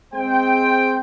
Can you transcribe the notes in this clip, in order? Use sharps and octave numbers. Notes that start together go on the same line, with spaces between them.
G#3 C4 C5 G5